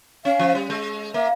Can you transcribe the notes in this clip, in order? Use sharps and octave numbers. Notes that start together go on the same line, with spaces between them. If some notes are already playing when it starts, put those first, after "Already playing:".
C#4 F5
F3
G3
G#3
A#3 E5